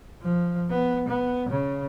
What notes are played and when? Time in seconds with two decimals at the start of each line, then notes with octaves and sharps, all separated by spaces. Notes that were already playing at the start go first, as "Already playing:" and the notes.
0.22 F3
0.70 B3
1.08 B3
1.49 C#3